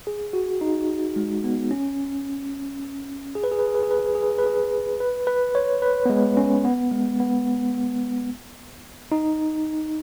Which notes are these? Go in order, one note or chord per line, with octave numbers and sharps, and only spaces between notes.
G#4
F#4
D#4
G#3
B3
C#4
G#4
B4
G#4
B4
G#4
B4
G#4
B4
G#4
B4
G#4
B4
G#4
B4
G#4
B4
B4
C#5
B4
B3
G#3
C#4
B3
G#3
B3
D#4